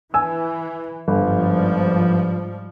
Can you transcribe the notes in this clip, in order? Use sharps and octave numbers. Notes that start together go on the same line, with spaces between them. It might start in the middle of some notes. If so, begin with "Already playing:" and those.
E3 G#5 E6
G1 G#2 F3 G3